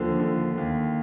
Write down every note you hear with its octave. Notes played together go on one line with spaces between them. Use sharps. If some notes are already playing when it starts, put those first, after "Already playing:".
Already playing: D#2 D3 F3
D3
D#2